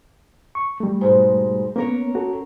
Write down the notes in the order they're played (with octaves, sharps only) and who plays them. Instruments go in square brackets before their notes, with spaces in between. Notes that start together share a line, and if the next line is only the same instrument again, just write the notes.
[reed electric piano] C#6
G3 A3
[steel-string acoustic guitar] G#2 B2 G#3
[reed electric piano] A#3 B3 [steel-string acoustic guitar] C#4 A#4 C#5
[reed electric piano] F#4 A4